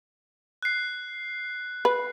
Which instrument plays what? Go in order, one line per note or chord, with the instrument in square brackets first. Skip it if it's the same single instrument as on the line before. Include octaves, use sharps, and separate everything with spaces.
[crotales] F#6 C7
[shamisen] B4